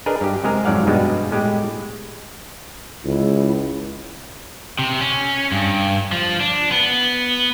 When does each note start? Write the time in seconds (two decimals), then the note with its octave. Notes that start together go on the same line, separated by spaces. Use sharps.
0.06 D4 G#4 A#4 B4 D#5
0.21 G2 G4
0.44 C3 G#3 G#4 A#4
0.65 F2 G#2 F#3 D5 F5 F#5
0.87 G2 B2 G3 G#3
1.31 A2 G#3 G4
3.05 C#2 E4
4.79 C3
5.01 C#4
5.52 G2
6.12 F3
6.40 D4
6.72 B3